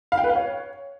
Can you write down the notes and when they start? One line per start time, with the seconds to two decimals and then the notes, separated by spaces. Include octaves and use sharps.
0.12 F5
0.18 G5
0.24 B4
0.30 F5
0.35 C#5